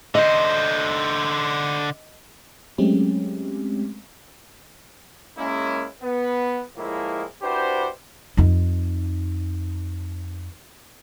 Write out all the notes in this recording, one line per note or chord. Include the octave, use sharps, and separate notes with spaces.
D3 C5 D#5
F#3 G#3 A3 C4 C#4 G4
G#3 A#3 C#4 E4
B3
A2 F3 G#3 A#3 E4
D4 E4 F#4 G4 B4 C5
F2 D#4